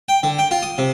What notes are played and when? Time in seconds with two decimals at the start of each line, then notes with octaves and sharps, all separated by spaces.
0.09 G5
0.23 D3
0.39 G5
0.51 F4
0.63 D#6
0.78 C3